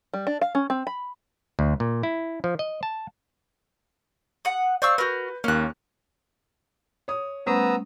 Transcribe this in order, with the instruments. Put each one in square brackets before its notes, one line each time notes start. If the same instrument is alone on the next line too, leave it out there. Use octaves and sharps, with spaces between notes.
[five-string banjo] G3
D4
F5
C#4
C4
B5
[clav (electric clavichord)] D2
A#2
E4
F3
D#5
A5
[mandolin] F#5 D#6
[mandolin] C5 C#6 E6 [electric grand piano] D5 F5
[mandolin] F#4 A#4 [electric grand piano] B4 G6
[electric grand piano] D#2 A#3 [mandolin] C#4 F#6
[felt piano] C#5 D#6
[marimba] G3 A3 C#4 [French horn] B3 [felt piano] C5 [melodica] A#5 D#6 E6